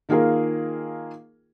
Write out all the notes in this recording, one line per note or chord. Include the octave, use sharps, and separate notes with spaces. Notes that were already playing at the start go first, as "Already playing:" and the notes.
D#3 A#3 F4 G#4 A#4